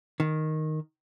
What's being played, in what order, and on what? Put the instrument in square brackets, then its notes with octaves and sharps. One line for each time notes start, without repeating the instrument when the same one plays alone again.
[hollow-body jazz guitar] D#3